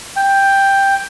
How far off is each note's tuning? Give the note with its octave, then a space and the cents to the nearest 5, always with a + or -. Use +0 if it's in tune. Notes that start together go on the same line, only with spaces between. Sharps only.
G5 +5